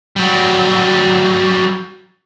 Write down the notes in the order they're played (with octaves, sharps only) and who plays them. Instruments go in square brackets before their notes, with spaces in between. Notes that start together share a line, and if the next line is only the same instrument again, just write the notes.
[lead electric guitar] F#3 G3